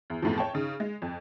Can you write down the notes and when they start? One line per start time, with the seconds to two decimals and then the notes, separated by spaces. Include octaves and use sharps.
0.10 E2
0.22 E2 A2 C3 F3
0.38 C#5 G5 A5
0.53 C#3 D#4
0.80 G#3
1.02 F2